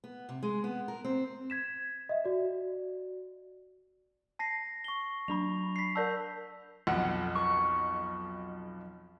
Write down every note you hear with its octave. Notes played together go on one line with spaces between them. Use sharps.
B3
C3
G#3
B3
A#4
C4
G#6 B6 E7
D#5 E5
F#4 D5
A5 A#6 C7
C#6 G7
F#3 D4 B5 F7
B6 C7
A#4 D5 A5 E6 G6
B1 F2 F#5
C#6